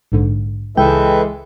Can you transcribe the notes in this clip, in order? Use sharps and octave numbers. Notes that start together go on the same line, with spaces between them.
A#1 G#2 D3
C#2 E3 G#3 A4 B4 E5 G5